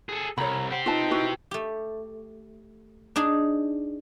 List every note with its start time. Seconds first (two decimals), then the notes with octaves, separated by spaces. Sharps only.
0.09 G#4 A4
0.38 C2 C#5 A#5 B5
0.71 G4 C5 F#5
0.86 D#4 F4 B4 A5
1.11 E4 F#4 B4
1.51 A3 G4
3.16 D4 D#4 G#4